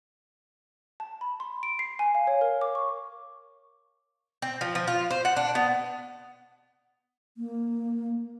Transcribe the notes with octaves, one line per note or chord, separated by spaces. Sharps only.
A5
B5
C6
D7
C7
G#5
F5
C#5
A#4
D6
C#6
C4
F3
F3
F4
C5
F#5
D4
B3
A#3